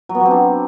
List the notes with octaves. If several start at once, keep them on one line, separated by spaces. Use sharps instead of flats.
F#3
B3
F#3
C4
D4